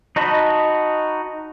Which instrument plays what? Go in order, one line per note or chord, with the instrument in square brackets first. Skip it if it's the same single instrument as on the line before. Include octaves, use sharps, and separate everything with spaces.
[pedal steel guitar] D#4 F#4 D#5 A5 B5